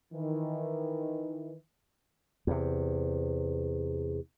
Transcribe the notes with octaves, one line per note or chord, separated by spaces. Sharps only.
D#3 E3
E2 C3